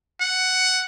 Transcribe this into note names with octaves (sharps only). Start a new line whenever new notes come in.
F#5